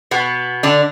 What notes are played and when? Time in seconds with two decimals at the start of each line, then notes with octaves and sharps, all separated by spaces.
0.11 B2 B3
0.63 D3 D4